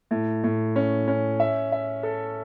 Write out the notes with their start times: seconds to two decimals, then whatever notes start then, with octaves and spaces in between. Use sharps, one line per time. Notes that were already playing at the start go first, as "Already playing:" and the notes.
0.11 A2
0.44 A2
0.76 C#4
1.08 C#4
1.40 E5
1.72 E5
2.03 A4